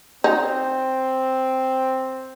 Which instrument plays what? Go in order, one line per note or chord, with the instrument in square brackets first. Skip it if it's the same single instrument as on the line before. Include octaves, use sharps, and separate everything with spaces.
[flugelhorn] C4 [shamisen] D#4